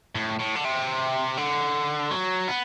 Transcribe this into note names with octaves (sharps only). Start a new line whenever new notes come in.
A2
A2
D3
C3
D3
F#3
B3